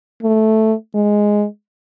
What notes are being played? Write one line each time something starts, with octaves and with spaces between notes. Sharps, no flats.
A3
G#3